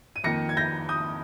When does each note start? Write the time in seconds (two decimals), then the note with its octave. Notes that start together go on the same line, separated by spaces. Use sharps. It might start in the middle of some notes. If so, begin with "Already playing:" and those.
0.16 D#7
0.24 F2 D#3 A#3 A#6 C#7
0.49 G#6
0.57 G6 A#6
0.89 D#6 G6